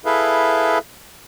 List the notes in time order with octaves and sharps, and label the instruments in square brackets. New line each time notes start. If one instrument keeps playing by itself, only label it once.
[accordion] E4 G#4 A4 B4 E5 F5